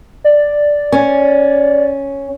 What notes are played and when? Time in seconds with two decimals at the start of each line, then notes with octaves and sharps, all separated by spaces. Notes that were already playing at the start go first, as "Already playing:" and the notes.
0.24 D5
0.92 C#4